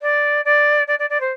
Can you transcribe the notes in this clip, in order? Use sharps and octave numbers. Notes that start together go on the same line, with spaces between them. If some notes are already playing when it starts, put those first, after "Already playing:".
D5
D5
D5
D5
D5
C5